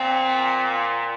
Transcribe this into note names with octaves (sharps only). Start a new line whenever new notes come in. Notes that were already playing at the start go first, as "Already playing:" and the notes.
Already playing: A#2 C4